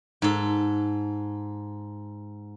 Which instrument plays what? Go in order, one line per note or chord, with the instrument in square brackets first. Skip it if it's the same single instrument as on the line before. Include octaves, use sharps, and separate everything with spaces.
[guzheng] G#2 A4